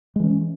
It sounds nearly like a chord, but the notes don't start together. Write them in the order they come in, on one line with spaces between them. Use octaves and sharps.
G#3 E3 C#4